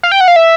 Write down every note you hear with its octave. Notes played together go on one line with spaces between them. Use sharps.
F5
G5
F#5
F5
E5